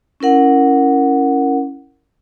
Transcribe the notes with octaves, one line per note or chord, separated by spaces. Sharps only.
C#4 E4 A#4 F#5